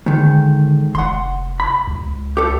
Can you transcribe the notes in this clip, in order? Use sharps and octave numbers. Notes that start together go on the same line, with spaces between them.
G#2 D3 D#3
F1 F#5 C6
B5
C#2
G4 A4